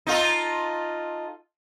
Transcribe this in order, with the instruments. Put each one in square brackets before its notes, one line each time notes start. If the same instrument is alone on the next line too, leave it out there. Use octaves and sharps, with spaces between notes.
[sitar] D#4 F4 A4